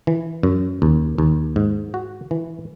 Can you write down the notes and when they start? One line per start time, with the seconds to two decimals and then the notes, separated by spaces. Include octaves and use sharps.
0.07 E3
0.43 F#2
0.82 D#2
1.18 D#2
1.56 G#2
1.94 F#4
2.31 E3